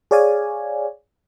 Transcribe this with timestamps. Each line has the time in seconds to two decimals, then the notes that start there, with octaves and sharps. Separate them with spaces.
0.11 G#4 C#5 D5 F5 G#5